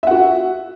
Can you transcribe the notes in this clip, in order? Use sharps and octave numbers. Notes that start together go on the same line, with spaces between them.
F#4 E5 F#5